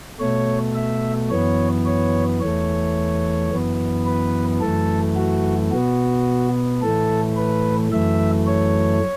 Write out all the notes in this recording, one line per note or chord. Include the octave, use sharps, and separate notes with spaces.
B2 A3 C#5
E5
F#2 E3 B3 C#5
C#5
E2 E3 A3 C#5
F#2 E3 B3
B4
F#2 E3 A3 A4
F#4
B2 B3 F#4
A2 E3 A3 A4
B4
F#2 E3 A3 E5
C#5